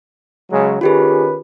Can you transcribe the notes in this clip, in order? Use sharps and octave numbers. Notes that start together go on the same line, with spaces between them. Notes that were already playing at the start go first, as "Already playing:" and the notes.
C#3 F#3 G#3
D#3 C#4 F4 G4 G#4 B4